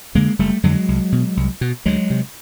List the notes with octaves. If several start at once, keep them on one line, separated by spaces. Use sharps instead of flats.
F2 D3 G#3 A#3
F#1 G3 A3
F2 D3 F#3 G#3
C2
B2
C2
B2
D2 F#3 G#3
C3